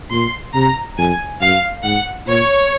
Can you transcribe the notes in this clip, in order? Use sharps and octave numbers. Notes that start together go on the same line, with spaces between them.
A#2 C6
C3 A#5
F2 G#5
F#2 F5
G#2 F#5
A#2 C#5